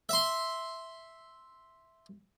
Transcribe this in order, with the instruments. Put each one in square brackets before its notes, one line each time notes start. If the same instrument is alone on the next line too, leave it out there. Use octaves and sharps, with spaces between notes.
[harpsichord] E5 C6